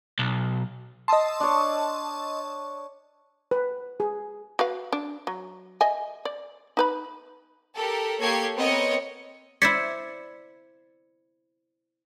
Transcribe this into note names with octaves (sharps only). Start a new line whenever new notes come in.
B1
D#5 A5 C6 D#6 E6
D4 C#5
B4
G#4
F#4 B4 F5
D4
F#3
D#5 E5 G#5
D5
D#4 B4 B5
G4 A4 A#4
A#3 G4 A4 C#5 G#6 C7
B3 C4 A#4 C#5 D#5 C#7
E4 C5 D5 G#6 B6 C#7